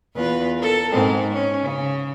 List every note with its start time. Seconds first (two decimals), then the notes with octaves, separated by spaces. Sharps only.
0.15 E2 F4 B4
0.57 A4 A#4
0.92 G#2 C4
1.33 C#4
1.63 C#3